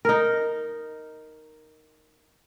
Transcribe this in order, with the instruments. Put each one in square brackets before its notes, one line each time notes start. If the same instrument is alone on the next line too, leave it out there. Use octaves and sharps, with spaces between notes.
[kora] D#4 A#4